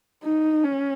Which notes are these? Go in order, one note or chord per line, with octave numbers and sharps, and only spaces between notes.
D#4
C#4